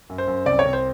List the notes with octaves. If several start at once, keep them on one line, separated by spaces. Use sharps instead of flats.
F#2
C5
F#2
C2 D5
C#5
C2
C5